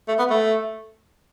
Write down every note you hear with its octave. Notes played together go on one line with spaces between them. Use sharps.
A3
B3
A3